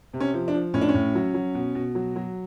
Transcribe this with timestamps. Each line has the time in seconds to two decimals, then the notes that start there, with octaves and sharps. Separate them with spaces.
0.13 C3
0.20 C#4
0.34 F3
0.48 D4
0.54 F3
0.74 A2 C#4
0.81 D4
0.89 C#4
0.94 A2
1.15 F#3
1.34 F#3
1.55 B2
1.75 B2
1.95 F#3
2.16 F#3